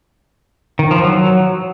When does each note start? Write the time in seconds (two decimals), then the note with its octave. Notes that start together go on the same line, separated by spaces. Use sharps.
0.79 D#3
0.91 F3
1.03 F#3